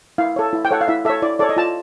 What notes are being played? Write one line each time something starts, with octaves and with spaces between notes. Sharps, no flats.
E4 F5
A4 C#5
E4
G5
A4 C#5 F#5
F5
E4 E5
A4 C#5 E5
E4 D5
A4 C#5 D5
D#5
F4 A5